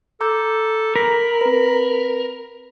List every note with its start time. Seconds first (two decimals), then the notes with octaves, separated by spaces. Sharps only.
0.21 A4 A#5 D6 G6
0.96 A#4 B5
1.41 C4 B4